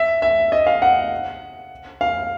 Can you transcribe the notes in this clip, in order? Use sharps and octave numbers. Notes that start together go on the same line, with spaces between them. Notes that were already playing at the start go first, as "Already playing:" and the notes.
Already playing: E5
E5
D#5
F5
F#5
F5